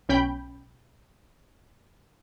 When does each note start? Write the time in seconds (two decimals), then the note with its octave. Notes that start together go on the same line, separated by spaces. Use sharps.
0.09 B1 C#4 G5 B5 G6